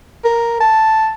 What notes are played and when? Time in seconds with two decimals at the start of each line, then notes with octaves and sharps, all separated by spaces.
0.25 A#4
0.61 A5